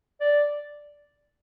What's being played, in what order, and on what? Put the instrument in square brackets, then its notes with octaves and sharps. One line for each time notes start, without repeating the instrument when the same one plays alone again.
[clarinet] D5